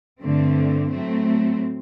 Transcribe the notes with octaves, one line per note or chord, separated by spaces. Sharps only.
G2 D3 A3 C4
A2 F#3 A3 C4